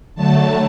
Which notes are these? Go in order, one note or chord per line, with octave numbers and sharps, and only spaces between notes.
D3 F#3 A3 A5